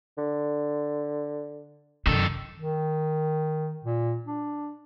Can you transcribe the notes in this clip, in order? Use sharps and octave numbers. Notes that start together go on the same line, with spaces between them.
D3
F#2 C3 D#3 A4
D#3
A#2
D4